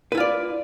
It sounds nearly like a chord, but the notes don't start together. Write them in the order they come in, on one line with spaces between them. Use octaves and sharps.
B4 E4 F4 D5